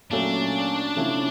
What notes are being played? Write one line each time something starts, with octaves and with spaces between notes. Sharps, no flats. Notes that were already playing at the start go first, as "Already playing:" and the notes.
A#2 F#3 A3 C#4 D4
C3 F3 A3 C#4 E4